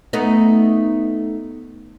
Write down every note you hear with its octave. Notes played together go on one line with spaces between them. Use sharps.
A3 B3 D#4